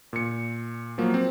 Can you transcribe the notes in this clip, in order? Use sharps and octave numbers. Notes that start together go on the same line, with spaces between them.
A#2 C#7
F3 F#3 A#3
C4